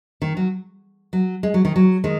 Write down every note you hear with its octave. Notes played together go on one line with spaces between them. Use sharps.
D#3
F#3
F#3
G#3
F#3
D#3
F#3
D#3 G#3